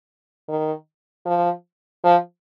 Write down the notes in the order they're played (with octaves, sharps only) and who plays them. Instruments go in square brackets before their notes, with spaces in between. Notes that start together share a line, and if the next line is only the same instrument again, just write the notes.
[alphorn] D#3
F3
F3